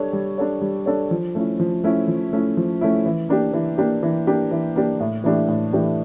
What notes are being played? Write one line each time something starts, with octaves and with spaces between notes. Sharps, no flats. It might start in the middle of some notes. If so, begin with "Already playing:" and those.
Already playing: G3 D4 A4 C#5
G3
D4 A4 C#5
G3
D4 A4 C#5
F3
A3 C#4 E4
F3
A3 C#4 E4
F3
A3 C#4 E4
F3
A3 C#4 E4
E3
A#3 D4 G4
E3
A#3 D4 G4
E3
A#3 D4 G4
E3
A#3 D4 G4
A2
E3 A3 D4 G4
A2
E3 A3 D4 G4